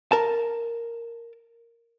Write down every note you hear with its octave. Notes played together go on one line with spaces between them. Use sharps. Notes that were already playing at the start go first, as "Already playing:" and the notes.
A#4 A5